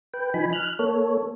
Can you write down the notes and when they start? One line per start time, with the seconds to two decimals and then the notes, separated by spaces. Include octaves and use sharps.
0.14 B4 G5
0.34 F3 D#4 G#5 B5
0.53 F6 F#6
0.79 A#3 A4 C#5